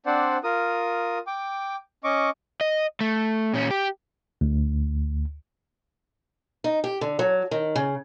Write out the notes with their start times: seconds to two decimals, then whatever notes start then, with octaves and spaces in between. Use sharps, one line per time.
0.06 C4 D4 C5 D5 F#5
0.44 F4 A#4 D#6
1.27 G5 D6
2.04 C#4 D#5 C#6 D6
2.61 D#5
3.01 A3
3.54 A#2 C#4
3.71 G4
4.41 D2
6.64 D#4
6.84 G4
7.01 D3
7.19 F#3
7.51 D#3
7.76 C#3